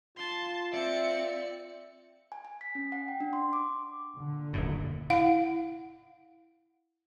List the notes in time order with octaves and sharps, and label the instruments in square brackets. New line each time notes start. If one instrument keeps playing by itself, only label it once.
[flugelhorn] F4 [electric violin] A5 C6
[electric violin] C4 C#7 [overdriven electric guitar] D5 [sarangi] E5
[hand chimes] G#5
G#5
B6
C#4
F#5
G5
D4
C6
D6
[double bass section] A#2 D3
[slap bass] D#1 F#2 A2
[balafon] E4 F5 F#5